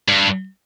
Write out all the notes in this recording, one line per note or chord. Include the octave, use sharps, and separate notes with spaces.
G2